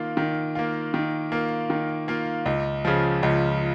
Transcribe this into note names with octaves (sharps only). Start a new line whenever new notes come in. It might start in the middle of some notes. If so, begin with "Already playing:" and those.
Already playing: D#3 A#3 F4
D#3
A#3 F4
D#3
A#3 F4
D#3
A#3 F4
C#2
C#3 F3
C#2